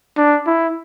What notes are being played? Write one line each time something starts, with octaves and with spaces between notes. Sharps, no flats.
D4
E4